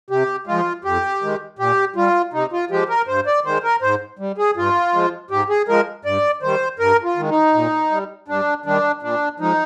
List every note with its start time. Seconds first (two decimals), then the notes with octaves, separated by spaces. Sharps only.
0.10 C3 G4
0.47 F3 G#3 F4
0.84 F2 G4
1.22 D#3 G#3
1.59 A#2 G4
1.96 G3 F4
2.33 C3 D#4
2.52 F4
2.70 F3 G#3 G4
2.89 A#4
3.07 G2 C5
3.27 D5
3.45 D#3 G#3 C5
3.63 A#4
3.82 G#2 C5
4.19 G3
4.38 G#4
4.57 G2 F4
4.94 F3 G#3
5.31 G#2 G4
5.49 G#4
5.68 F3 G#3 A#4
6.05 G2 D5
6.42 D#3 G3 C5
6.79 G2 A#4
7.04 F4
7.17 D#3 G#3
7.29 D#4
7.54 A#2
7.91 G3
8.28 G2 D4
8.66 D#3 G3 D4
9.02 A#2 D4
9.40 F3 G#3 D#4